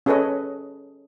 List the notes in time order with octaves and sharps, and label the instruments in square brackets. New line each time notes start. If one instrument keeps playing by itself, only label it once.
[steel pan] C#4 G#4 A4 B4 C#5 D#5